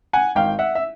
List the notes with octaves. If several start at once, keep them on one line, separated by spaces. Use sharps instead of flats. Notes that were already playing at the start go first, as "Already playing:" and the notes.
F#5 G#5
G#1 F5 G5
E5 F#5
E5